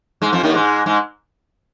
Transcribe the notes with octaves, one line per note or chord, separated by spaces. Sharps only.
G#2 G#3
F2 F3
D#2 D#3
G#2 G#3
G#2 G#3